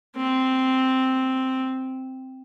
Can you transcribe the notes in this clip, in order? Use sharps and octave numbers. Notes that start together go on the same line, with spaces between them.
C4